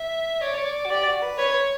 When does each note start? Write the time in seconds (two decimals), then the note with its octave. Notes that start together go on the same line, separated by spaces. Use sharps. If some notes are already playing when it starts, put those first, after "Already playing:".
Already playing: E5
0.41 C#5 D5
0.58 C#5
0.65 D5
0.85 F#4
0.90 G4 D5
1.06 F#4
1.22 B4
1.38 B4 C#5
1.55 C#5